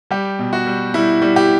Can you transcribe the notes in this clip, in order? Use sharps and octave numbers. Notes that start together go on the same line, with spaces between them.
G3 G4
B2
F#4
G3
G3 E4
G3
G4